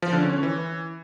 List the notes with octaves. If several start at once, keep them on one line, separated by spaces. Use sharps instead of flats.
F3
D3
C#4
C#4
E3